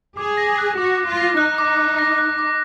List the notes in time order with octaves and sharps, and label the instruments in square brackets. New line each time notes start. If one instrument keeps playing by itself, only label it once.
[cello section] G#4 [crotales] D6
[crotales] A#6
F#6
[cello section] F#4 [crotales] D6
[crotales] D6
[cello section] F4
[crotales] A#6
[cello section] D#4 [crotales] F#6
[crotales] D6
D6
A#6
F#6
D6